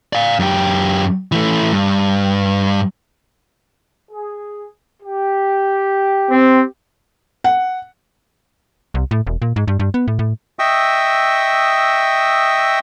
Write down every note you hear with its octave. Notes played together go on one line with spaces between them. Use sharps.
D5 F5
F#2 G4
E3 A3
G2
G#4
G4
C4
F#5
C2
A2
E1
A#2
G#2
G2
G2
B3
A2
A2
D#5 E5 G5 C#6 D#6 E6